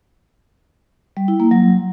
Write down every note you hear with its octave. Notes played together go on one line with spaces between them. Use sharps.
G3
E4
A#3
F#3